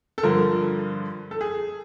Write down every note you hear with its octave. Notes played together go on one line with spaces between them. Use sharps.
A4
G2 D3 F3 A#4
A4
G#4